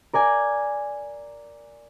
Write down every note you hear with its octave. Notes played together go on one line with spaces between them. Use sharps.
A#4 D5 G#5